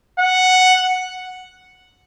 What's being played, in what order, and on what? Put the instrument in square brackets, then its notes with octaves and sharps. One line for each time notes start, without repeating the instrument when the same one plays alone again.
[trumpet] F#5